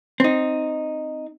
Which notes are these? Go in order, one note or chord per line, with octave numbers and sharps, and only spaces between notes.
C4 D#4